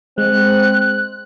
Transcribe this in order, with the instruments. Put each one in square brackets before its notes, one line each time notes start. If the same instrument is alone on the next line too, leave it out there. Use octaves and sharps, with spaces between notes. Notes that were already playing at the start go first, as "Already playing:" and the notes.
[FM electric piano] G#3 [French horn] C4 [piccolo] F#6